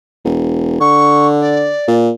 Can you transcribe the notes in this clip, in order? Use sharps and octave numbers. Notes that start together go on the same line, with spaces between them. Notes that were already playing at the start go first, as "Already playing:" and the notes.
E1
D3 C#6
D5
A#2